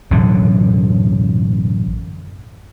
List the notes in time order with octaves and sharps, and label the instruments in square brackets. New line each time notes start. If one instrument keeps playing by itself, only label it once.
[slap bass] A1 F#2 B2 D3